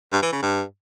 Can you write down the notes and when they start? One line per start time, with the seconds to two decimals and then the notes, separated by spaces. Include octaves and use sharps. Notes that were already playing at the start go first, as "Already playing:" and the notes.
0.13 G2
0.23 E3
0.33 C#3
0.42 G2